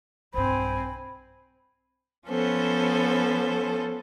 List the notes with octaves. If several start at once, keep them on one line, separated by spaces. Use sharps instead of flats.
B1 G2 C4 C5 G#5 B5
F3 B3 C#4 A4 C5